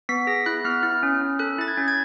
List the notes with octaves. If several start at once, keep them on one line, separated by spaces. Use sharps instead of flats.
B3 B6
G#4 A#6
E4 F#6
B3 F6
E4 F6
C#4
C#4
A4 F#6
E4 A6
G#6
C#4
G#6